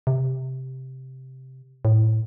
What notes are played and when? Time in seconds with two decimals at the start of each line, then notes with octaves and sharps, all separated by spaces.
0.07 C3
1.85 A2